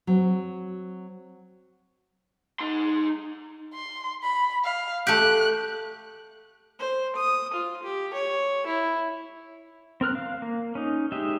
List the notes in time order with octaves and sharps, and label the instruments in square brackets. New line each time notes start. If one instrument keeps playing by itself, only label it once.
[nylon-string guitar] F#3 C4
[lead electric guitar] D#4 C6
[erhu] C6
B5
F5
[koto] A3 G4 [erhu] F#6
[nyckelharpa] C5
D#6
F4
G4
C#5
E4
[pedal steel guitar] C4 A#4 F6 F#6
F5
A#3
C#4 D#4
G#3 D#4 G4 E5